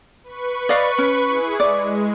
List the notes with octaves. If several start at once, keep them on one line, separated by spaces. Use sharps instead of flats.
B4 C#6
D5 D#5 F5
C#4
E4 G#4
G#3 D5